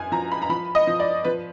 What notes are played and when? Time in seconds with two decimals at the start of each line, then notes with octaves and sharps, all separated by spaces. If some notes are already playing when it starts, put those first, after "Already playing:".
Already playing: F#2 G#5
0.12 F3 A#5
0.32 B5
0.42 A#5
0.49 F3 B5
0.75 D#5
0.87 F3
1.00 D5
1.24 F3 B4